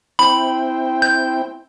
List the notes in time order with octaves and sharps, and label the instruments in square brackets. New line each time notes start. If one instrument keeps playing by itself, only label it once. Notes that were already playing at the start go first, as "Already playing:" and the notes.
[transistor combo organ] C4 E4 G5 [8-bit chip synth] B5
[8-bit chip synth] G6